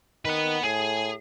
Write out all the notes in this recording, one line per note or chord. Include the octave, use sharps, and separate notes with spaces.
D#3 B4 F#5
A2 G#4